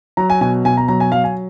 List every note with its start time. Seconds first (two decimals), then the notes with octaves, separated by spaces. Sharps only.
0.17 F#3 A#5
0.30 G#5
0.41 B2 G#5
0.65 B2 G#5
0.77 A#5
0.88 F#3 A#5
1.00 G#5
1.12 F#3 F5
1.24 G#5